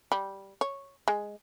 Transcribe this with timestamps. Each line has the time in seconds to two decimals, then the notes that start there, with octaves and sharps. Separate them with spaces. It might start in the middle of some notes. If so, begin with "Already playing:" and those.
0.12 G3
0.61 C#5
1.08 G#3